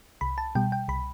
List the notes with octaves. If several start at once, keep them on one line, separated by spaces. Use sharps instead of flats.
C2 B5
A5
B2 G3 G5
G5
C2 B5